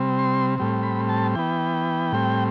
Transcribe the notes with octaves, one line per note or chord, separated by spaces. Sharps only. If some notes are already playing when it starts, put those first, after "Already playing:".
Already playing: C3 G3 C4
C6
A2 G3 C4
B5
A5
E3 B3 G5
A2 G3 C4